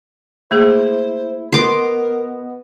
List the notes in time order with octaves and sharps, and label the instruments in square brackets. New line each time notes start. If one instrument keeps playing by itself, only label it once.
[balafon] A3 A#3 G#4 [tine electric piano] E4 [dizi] C5
[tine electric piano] B3 B4 D#5 [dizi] A#4 [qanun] C6 D6